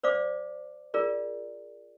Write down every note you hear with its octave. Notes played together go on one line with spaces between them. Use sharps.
C5 D5 F5 D6
F4 G#4 A#4 D5